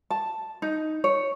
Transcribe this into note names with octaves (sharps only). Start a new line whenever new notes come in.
A5
D#4
C#5